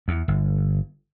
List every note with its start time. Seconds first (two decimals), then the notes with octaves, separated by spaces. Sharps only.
0.08 E2
0.28 G1